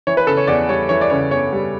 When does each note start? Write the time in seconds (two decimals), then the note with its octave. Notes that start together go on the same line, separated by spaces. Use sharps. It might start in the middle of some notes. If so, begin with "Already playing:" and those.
0.07 E3 C#5
0.17 B4
0.27 C#3 A4
0.37 C#5
0.47 E2 D5
0.69 G3 C#5
0.89 E3 C#5
1.01 D5
1.10 C#3 C#5
1.31 E2 C#5
1.53 G3